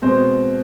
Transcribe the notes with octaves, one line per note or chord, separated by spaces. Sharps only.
B2 G#3 C4 C5